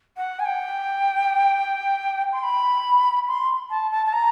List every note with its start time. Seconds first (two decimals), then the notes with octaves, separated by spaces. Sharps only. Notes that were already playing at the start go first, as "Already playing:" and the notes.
0.17 F#5
0.39 G#5
0.45 G5
2.33 C6
2.43 B5
3.28 C6
3.70 A5
3.92 A5
4.06 A5
4.13 A#5